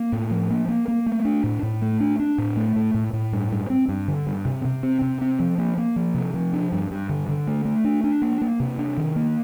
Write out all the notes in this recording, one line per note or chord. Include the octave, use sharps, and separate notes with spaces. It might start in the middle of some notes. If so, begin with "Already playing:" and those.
Already playing: A#3
A2
F3
A#3
A#3
A#3
A3
D4
A2
A2
A3
D4
D4
A2
A3
A2
A2
A2
G2
G2
C4
G2
D3
G2
C3
C3
C4
C3
C4
F3
A#3
A#3
F3
C3
F3
D4
G2
G2
D3
D3
A3
A3
D4
D4
A#3
A#3
C3
D4
D#3
A#3